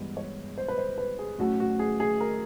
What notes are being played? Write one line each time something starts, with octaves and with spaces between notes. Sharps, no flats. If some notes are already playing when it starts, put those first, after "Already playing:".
Already playing: G2 E3 G#3 B3
C#5
C5
B4
C5
B4
G#4
A2 F#3 A3 C#4 F#4
F#4
G#4
G#4
A#4